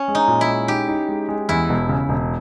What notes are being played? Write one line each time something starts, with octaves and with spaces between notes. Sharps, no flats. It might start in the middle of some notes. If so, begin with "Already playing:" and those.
Already playing: C#4
G#3
D#4
A#2
E4
G#3
D#4 G4
D#4
G#3
G#3
E2 E4
E1
C#3
E1